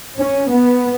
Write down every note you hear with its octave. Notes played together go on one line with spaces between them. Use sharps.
C#4
B3